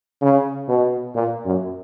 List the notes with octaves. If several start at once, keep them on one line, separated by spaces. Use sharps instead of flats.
C#3
B2
A#2
F#2